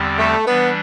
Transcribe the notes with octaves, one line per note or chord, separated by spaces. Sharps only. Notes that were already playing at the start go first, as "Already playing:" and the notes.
Already playing: E2 D3 G3 C4 G4
A3
E3 G3 B3 D4